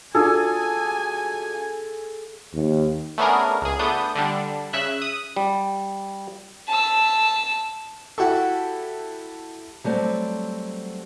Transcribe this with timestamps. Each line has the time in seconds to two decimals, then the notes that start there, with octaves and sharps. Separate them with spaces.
0.15 D4 F4 F#4 G#4 A4 G#5
2.53 D#2
3.18 A3 B3 C#4 D4 G#4 A#4
3.62 C#2 G#4
3.79 A3 B3 D4 D#6 G6
4.16 D3 G3 D4
4.73 C#3 E5 F#6
5.02 D#6
5.36 G3
6.68 A5 E6
8.18 E4 F#4 G4 A4 C#6
9.84 F#3 G3 A3 C4